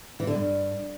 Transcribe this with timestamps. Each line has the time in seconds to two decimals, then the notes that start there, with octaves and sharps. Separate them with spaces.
0.20 E3
0.27 D3
0.35 G2